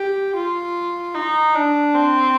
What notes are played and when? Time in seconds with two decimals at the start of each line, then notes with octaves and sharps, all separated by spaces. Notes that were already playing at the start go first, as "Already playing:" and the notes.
Already playing: G4
0.35 F4
1.14 D#4
1.55 D4
1.94 C4